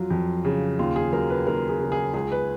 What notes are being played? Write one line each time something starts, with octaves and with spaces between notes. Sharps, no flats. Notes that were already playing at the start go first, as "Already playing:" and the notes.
Already playing: F2 F#3 F4
F2
C#3
D#2 F4
G#4
F#3 A#4
B4
D#2 A#4
G#4
C#3
G#4
C#2 G#4
B4